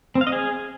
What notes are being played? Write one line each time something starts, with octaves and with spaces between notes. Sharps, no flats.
C4
F5
D#5
G#4